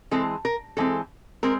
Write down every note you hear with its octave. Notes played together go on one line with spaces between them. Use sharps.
E3 G#3 C4 A4
A#4
E3 G#3 C4 A4
G#3 C4 A#4